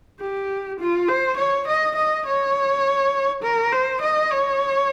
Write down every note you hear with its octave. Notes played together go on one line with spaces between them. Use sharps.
G4
F4
C5
C#5
D#5
D#5
C#5
A#4
C5
D#5
C#5